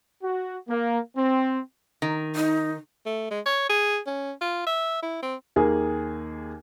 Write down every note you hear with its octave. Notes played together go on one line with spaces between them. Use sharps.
F#4
A#3
C4
D#3
D#4
A3
G#3
C#5
G#4
C#4
F4
E5
E4
C4
D#2 A#3 G#4